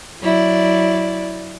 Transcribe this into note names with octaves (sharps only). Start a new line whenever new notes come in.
F#3 E4 D5